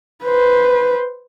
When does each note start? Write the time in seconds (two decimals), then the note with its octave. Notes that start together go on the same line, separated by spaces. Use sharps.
0.24 B4 C5